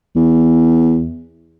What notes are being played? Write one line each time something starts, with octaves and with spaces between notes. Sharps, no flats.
E2